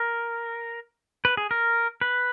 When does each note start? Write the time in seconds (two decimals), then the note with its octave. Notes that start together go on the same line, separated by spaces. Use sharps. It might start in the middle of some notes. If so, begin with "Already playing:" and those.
Already playing: A#4
1.25 B4
1.37 G#4
1.51 A#4
2.01 B4